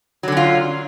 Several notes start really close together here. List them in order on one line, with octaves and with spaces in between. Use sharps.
F#3 D3 C#4 F4